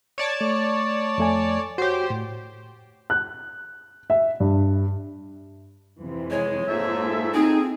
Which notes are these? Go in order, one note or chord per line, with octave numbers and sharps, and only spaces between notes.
C#5 D5 A5
A3
F2 A3 G#5
F#4 G4 C5 C#5
A2
F#6
E5
G2
F2 C3 E3
G#3 C#5
G#2 A#3 F4 A4 E5
C4 D#4 G#4